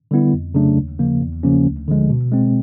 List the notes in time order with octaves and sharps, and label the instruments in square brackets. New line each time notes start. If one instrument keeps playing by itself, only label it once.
[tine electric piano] D3 G3 B3 E4
F2
C#3 F#3 A3 D4
D#2
C#3 F3 A#3
E2
C#3 F3 A#3 C#4
D2
D3 F3 G#3
B2
G#3 C4